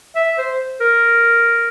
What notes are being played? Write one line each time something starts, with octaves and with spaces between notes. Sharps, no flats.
E5
C5
A#4